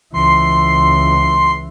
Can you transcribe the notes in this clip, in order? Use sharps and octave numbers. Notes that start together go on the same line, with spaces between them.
C#2 E3 C6